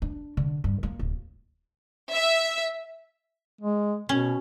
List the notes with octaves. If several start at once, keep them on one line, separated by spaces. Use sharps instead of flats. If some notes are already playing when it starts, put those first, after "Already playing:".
D4
D3
G2
A#3
D1
E5
G#3
B2 C#4